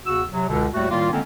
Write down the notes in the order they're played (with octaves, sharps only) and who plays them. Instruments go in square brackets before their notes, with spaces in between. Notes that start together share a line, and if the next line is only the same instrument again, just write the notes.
[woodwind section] E2 C#3 F#4 E6
C3 F#3
C#2 B2 D3
D#2 A2 G3 A3 F#4
A2 D#3 G3 A#3 F4
D3 G#3 A#3 C4 C#4